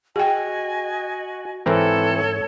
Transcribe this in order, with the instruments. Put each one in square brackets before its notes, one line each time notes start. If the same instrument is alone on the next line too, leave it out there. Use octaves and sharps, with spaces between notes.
[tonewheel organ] F#4 [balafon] G#4 G5 [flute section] D#5 G#5
[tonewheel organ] G#2 [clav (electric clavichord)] E3 C4 A#4 [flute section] A4 C#5